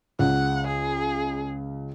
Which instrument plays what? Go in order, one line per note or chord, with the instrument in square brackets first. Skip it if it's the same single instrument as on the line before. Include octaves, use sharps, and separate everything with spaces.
[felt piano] C#2 [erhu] F#5
[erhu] G#4